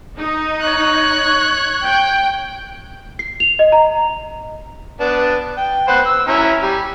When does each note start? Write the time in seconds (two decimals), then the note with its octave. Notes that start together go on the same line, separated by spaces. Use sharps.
0.18 D#4
0.61 C#5 F#6
1.84 G5
3.19 C7
3.40 F7
3.59 D#5
3.72 A#5
5.00 B3 D4 A5
5.58 G5
5.88 B4 C5 F#5
6.06 E6
6.27 C#4 E4 A#5
6.63 G3